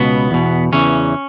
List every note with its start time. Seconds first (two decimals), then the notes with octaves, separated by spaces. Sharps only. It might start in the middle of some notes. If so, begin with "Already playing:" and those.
Already playing: C#2 B2 B3
0.31 E2 B2
0.72 E2 C#3 E3 C#4